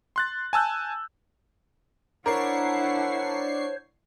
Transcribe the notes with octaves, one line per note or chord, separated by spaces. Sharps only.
C6 F#6 A6
G#5 A5 E6 F#6 G6
D4 E4 A#4 C5 C#5 F#5 C#6 C7